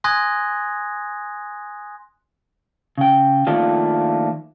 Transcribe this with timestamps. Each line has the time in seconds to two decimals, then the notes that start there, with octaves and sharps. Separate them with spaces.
0.04 G#5 C6 D#6 F#6 G#6 A#6
2.98 C#3 G5
3.47 D#3 F3 A3 A#3 D4 F4